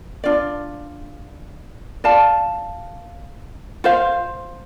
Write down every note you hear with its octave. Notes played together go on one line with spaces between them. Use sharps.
D4 F4 D5
F4 D5 F5 A5
F4 C5 F5